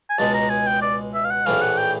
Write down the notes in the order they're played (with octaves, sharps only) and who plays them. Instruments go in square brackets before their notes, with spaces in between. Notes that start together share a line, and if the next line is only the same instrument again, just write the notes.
[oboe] G#5
[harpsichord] C#2 B2 G#3 [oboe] A5
[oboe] A#5
G#5
G5
D5
E5
F5
F#5
[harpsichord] A#1 A2 E3 A3 [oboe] F5
[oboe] F#5
G5